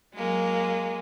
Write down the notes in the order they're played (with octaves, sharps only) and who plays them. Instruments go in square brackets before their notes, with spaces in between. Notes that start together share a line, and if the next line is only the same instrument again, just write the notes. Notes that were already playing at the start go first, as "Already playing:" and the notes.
[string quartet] F#3 G#3 A#3